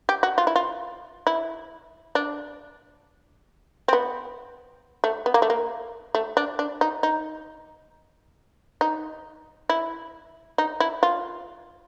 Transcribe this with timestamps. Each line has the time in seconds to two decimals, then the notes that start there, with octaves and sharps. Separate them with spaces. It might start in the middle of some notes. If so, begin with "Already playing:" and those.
0.09 G4
0.23 F#4
0.38 F4
0.47 E4
0.56 F4
1.27 E4
2.15 D4
3.88 C4
3.93 B3
5.04 A3
5.26 B3
5.34 A#3
5.42 A3
5.50 A#3
6.15 A3
6.37 D4
6.59 D4
6.81 D#4
7.03 D#4
8.81 D#4
9.69 E4
10.58 D#4
10.80 E4
11.03 F4